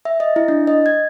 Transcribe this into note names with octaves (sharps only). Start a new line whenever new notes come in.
E5
D#5
E4
D4
D#5
G#6